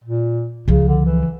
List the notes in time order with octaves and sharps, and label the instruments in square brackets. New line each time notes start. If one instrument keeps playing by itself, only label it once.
[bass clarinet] A#2
[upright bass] C#2 F3 [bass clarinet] C#3
[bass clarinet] D3
E3